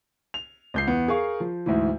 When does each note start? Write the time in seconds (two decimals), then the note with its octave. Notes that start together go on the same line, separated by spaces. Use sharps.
0.34 F7
0.74 C#2 G6 C7
0.87 E2 B3
1.08 G#4 A#4 F5 C#6
1.40 F3
1.66 D2 G#2 E3